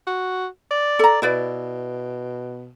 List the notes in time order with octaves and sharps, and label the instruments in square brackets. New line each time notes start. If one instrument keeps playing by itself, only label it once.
[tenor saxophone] F#4
D5
[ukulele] A4 A#5
[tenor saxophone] B2 [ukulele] E4 B4 D5